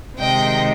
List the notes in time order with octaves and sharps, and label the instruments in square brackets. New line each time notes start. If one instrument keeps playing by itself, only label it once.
[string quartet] C3 D#3 G#3 D#5 G5